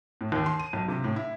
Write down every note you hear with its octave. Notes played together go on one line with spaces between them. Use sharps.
A2
D#2
C6
D#7
B1
C3
A2
E4